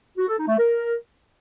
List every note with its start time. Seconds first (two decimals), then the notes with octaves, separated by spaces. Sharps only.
0.18 F#4
0.28 A4
0.38 D#4
0.48 A3
0.58 A#4